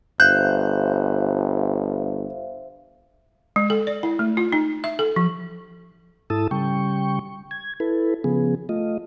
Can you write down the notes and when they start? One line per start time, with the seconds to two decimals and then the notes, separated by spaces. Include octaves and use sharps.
0.20 G1 C5 E5 F5 F#6 G6
3.56 G#3
3.70 A4
3.87 D5
4.03 E4
4.19 A3
4.37 F4
4.52 D#4
4.84 E5
4.99 A4
5.16 F3
6.30 G#2 E4 A4 A5 D#6 E6
6.51 C#3 G3 G5 C#6
7.51 G#6
7.80 E4 A4 B4
8.24 C#3 F3 B3 G#4
8.69 A3 F4 D#5